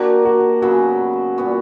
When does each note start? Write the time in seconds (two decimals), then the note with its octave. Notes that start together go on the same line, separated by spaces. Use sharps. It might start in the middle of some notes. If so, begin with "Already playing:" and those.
Already playing: A#3 D4 F#4 G4 A#4
0.25 F#4
0.62 C#3 F#3 B3 F#4
1.38 A#2 G3 B3 F#4